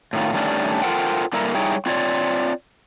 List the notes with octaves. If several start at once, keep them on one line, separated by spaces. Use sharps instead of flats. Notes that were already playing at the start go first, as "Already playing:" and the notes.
A2 D#3 F4
D#3 G3 A3 C#4 D4
F4 A4 A#4 C5 F#5 G5
D3 G3 A#3 E4 A4 A#4
G3 D#4 E4 G#4 C#5 G5
C4 F4 C#5 D5